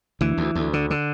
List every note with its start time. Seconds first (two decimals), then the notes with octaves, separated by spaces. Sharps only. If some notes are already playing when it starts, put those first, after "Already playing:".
0.21 D2 E3
0.38 D2
0.55 D2
0.73 D3
0.90 D3